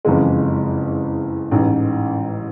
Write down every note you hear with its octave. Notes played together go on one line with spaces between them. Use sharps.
F#1 F2 C#3 E3 G#3
A1 G#2 E3